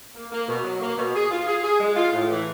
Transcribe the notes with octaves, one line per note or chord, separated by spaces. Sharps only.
A#3
A#3
B2
F#3
A#3
B2
G#4
F4
G#4
G#4
G#3
F4
A2
E3